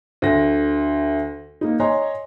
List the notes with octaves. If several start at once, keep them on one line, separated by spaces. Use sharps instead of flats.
D2 A#6
A#3 D#4
C#5 D#5 G#5 A#5 C6